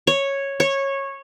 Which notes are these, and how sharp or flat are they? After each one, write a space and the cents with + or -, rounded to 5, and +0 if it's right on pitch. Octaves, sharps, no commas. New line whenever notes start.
C#5 -5
C#5 -15